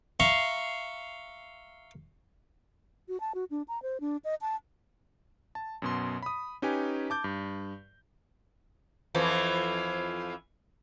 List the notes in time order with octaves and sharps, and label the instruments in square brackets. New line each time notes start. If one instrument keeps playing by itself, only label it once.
[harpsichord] E5 F5 A#5 C6 C#6
[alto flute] F#4
A5
F#4
D4
A#5
C5
D4
D#5
A5
[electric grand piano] A5
F#2 B2 C6
B5 D#6
C#4 D#4 G4 B4 G#5
A5 D6 G6
G2
[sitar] F2 E3 F3